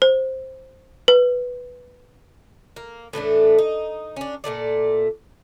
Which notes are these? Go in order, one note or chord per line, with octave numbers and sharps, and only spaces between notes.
C5
B4
A#3
A2 E3 A3 D4
D#4
C#4 D4
A#2 C#3 A3 D5